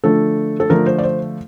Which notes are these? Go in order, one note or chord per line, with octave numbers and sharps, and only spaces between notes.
D3 F3 A3 D4 A4
A4
D3 F3 A3 D4 A#4
C5
D5
C5